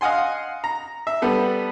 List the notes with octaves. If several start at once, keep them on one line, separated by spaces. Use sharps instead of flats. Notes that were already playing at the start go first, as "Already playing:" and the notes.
D#5 F5 F#5 G#5 C6
A#5
E5
G3 B3 A4